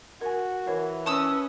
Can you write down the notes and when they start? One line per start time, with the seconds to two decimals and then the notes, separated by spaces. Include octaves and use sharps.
0.21 F#4 A#4 G#5
0.67 E3 A#4 C#5
1.06 C#4 B4 A5 D#6 E6